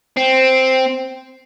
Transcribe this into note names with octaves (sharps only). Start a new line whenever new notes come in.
C4